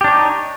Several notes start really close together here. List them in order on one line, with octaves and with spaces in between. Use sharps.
G4 D4 C#5 D#4